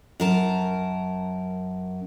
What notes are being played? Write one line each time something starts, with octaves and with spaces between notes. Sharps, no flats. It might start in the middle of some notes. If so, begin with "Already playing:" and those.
F#2 A#4 A5